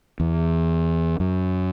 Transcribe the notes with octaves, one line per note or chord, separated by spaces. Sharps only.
E2
F#2